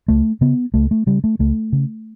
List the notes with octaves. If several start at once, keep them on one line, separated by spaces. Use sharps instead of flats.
C#2 A3
C#3 B3
C#2 A3
A3
C#3 G3
A3
C#2 A3
C#3